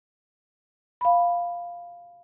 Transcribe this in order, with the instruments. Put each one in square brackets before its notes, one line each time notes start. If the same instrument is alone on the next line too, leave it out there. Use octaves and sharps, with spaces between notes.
[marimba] F5 B5